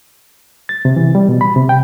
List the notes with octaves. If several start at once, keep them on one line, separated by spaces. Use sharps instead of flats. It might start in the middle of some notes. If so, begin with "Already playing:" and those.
A6
C3
E3
G3
B2
B5
C3
G5